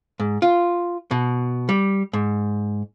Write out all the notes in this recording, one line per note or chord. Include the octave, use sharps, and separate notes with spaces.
G#2
F4
B2
G3
G#2